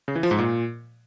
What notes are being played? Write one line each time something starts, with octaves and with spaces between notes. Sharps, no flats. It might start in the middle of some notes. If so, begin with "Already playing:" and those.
C#3
E3
F3
G#2
A#2